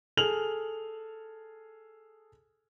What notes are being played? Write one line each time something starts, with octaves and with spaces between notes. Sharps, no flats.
G#4 A4 F6 F7 F#7